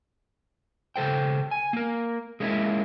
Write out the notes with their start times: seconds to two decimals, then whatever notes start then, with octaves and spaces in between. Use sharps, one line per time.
0.96 C#3 A4 C5 G5
1.51 G#5
1.73 A#3 A#4
2.40 G#3 A#3 C#4 D#4 E4